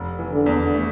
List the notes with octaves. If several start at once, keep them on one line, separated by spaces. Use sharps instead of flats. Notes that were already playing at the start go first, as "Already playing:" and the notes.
Already playing: F1
E3
D3
E2
A3